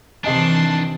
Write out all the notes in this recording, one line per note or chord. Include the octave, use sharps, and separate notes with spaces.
C3 D#3 E3 D4 D#5 G#5 A5 C6